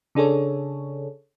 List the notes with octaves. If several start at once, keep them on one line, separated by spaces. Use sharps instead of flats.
C#3 D4 G#4 A4 C#5